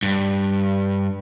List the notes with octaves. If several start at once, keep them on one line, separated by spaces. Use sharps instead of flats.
G2